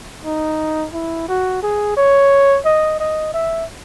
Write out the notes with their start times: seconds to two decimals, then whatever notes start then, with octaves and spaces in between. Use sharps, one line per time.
0.25 D#4
0.94 E4
1.28 F#4
1.63 G#4
1.97 C#5
2.65 D#5
3.00 D#5
3.34 E5